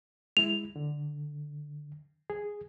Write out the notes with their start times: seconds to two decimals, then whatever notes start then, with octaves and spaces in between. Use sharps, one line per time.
0.37 G#3 E4 F7
0.76 D3
2.30 G#4